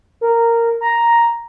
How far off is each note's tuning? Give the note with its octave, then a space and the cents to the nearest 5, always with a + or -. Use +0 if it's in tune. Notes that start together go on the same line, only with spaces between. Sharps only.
A#4 -10
A#5 +5